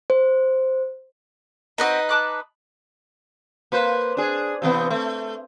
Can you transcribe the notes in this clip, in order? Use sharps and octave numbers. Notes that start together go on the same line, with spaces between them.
C5
C4 D#4 F#4 B4 D#5 B5
A5 D6 F#6
A#3 B4 C5
D4 G#4
C3 E3 B3
A3